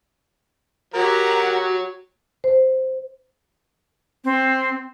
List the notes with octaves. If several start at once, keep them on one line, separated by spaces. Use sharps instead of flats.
F#3 F#4 G4 A#4 F#5 A#5
C5
C4